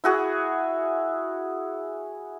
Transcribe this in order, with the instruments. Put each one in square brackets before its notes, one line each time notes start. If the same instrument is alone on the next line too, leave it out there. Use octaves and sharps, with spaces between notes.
[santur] E4 F#4 G#4